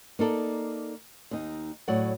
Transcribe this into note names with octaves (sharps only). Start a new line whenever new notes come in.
A#3 D#4 A4 D5
D#2 D#4
A2 F#3 D5 F#5